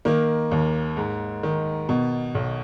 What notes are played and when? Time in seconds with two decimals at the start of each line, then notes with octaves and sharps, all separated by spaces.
0.05 D#3 A#3
0.51 D#2
0.97 G#2
1.43 D#3
1.89 B2
2.35 B1